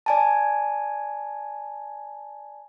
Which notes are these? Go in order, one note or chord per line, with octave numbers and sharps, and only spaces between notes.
D5 G#5 A5